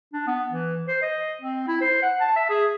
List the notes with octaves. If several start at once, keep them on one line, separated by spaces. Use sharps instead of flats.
D4
B3
E3
C5
D#5
C4
E4
C5
F#5
A5
E5
G#4